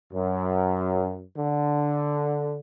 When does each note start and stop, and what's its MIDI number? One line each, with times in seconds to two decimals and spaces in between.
0.14 1.20 42
1.36 2.59 50